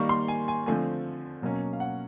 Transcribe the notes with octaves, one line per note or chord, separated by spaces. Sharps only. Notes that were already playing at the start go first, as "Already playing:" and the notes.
Already playing: D#3 G3 A#3 C#6
C6
G#5
G#5
D3 F3 A3 C4 G#5
B2 F#3 A#3 C#4
F5
F#5